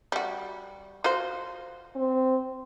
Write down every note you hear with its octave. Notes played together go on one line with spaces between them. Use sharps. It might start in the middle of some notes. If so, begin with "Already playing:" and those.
G3 F#4
F4 F#4 C5
C4